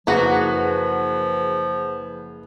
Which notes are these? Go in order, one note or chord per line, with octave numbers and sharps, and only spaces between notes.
F#1 F3 A#3 F#4 G#4 B4 F#5